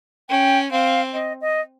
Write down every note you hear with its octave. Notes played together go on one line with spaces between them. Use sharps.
C#4 G5
C4 F5
D#5
D#5